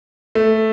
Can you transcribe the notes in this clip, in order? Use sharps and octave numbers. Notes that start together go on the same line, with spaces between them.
A3